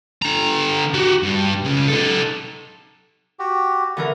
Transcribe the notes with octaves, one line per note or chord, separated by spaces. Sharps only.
D3 A#5
F#4 G4
G2
C#3 G#3
D#4 A4
F#4 G4
D3 E3 A#4